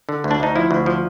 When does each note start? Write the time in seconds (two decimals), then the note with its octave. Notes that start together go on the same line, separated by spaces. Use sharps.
0.09 D3
0.24 D2
0.31 D4
0.40 D2 D#4
0.55 F3 E4
0.71 D2
0.86 F3